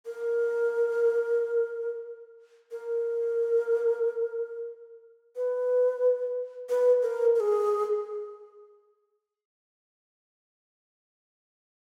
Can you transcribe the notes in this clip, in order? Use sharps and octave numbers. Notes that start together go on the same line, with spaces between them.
A#4
A#4
B4
B4
A#4
A#4
G#4